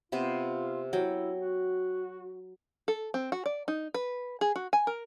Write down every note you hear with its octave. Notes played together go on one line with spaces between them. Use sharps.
C3 B3 F4 C5
F#3 E4 G5
F#4
A4
C4
F#4
D5
D#4
B4
G#4
F#4
G#5
A#4